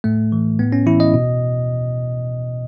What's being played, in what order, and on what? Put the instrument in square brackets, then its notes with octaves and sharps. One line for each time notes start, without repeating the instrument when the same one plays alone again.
[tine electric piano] A2 A3
E3
A2 B3
C#4
E3 E4
D#5
B2